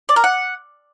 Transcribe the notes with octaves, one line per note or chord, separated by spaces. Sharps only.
D5
A#4
F#5